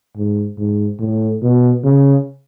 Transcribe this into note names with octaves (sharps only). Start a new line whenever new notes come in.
G#2
G#2
A2
B2
C#3